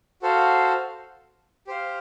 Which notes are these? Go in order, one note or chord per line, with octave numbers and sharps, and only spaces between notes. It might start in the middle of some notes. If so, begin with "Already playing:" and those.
F#4 A4 C5 F5
G4 C5 F5